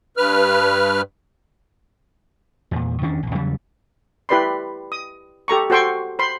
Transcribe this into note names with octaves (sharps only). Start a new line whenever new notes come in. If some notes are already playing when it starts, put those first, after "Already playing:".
G2 B4 F6
E2 A#2
E2 D#3 C#4 D4
A#1 E2
E2 C#3 F#3 G3
E4 G4 B4 D5 B5 C6
D#6
G4 A4 A#5 C#6
F#4 A4 C5 G5 C6 C#6
C5 B5 C6